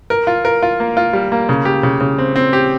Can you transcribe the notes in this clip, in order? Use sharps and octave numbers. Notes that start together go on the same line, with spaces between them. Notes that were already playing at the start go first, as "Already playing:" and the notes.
A#4
F4
A#4
F4
A#3
F4
G3
A#3
C#3
G4
C#3
C#3
C4
C4
G4